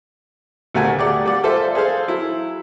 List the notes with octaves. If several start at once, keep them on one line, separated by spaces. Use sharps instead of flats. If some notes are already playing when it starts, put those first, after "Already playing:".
D2 G3 A3 F#4 A#4 G#5
G4 G#4 D5 F#5
G3 D5 F#5
F4 A4 C5 E5
G#4 A4 C5 F5
F#3 E4